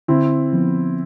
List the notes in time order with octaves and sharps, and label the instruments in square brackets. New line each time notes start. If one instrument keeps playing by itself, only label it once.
[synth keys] D3 [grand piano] C4 E4
[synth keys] F3 B3